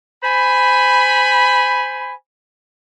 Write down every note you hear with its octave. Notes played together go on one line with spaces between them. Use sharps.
C5 G#5 B5